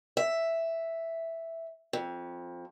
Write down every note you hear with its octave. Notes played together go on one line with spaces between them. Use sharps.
E5
F2